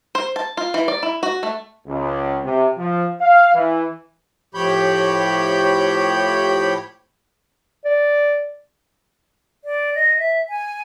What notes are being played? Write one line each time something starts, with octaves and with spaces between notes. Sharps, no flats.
C5
A5
F4
E3
D5
E4
F#4
A3
C#2
C3
F3
F5
E3
A2 F3 G4 C#5 B5 G6
D5
D5
D#5
E5
G#5